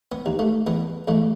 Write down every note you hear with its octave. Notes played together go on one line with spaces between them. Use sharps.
B3
D#2
A3
E2 B3
E2 A3